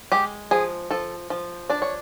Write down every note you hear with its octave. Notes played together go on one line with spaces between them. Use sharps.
G#3 G4
F3 G#4
F3 A4
F3
D4 D5
C#5